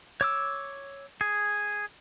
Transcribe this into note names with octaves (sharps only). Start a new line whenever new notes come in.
C#5 D6 E6
G#4